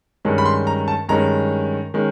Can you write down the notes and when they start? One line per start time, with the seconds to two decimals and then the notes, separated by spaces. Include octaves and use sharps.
0.25 G2 D#3 G#3 C#4
0.38 B5
0.46 C6
0.67 A#5
0.88 A5
1.09 G2 D#3 G#3 C#4 A#5
1.94 D#3 G#3 C#4